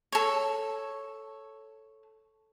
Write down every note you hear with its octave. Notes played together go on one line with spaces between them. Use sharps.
A4 C#5